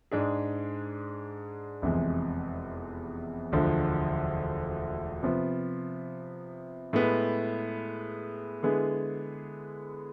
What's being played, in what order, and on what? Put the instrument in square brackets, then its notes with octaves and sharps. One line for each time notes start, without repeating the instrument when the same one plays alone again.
[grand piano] G#2 G#3 D4 G#4
F1 E2 C3 G#3
E1 D2 D3 F3
C3 F3 B3
A2 G#3 B3
D3 G#3 B3 E4 G#4